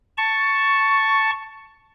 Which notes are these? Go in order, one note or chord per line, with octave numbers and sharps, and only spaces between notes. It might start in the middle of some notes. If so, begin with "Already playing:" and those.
A5 C#6